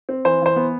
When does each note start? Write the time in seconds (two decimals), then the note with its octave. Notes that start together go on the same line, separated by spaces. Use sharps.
0.09 C4
0.25 E3 C5
0.42 E3 C5
0.56 B3